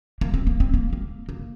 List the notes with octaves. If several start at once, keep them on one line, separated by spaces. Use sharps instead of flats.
A#3
C4
A#3
C4
A#3
A#3
A#3